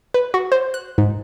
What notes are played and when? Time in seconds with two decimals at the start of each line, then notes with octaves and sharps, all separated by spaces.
0.14 B4
0.34 F#4
0.52 C5
0.74 F#6
0.98 G#2